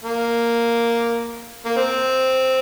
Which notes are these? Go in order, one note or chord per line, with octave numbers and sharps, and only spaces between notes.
A#3
A#3
C4